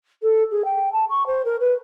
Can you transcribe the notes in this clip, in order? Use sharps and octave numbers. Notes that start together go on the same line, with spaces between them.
A4
G#4
G5
A5
C#6
C5
A#4
B4